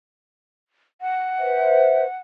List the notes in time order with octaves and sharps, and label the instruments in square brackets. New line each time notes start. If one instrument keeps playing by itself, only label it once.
[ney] F#5
[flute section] B4 C5 E5